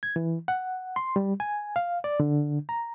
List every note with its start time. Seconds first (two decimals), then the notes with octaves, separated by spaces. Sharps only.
0.03 G#6
0.16 E3
0.48 F#5
0.96 C6
1.16 G3
1.40 G#5
1.76 F5
2.04 D5
2.20 D3
2.69 A#5